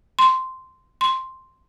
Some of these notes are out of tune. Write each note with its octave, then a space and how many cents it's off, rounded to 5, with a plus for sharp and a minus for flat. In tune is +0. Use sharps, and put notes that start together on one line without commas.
C6 -10
C6 +0